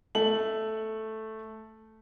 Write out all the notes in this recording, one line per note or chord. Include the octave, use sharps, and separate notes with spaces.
A3 F#7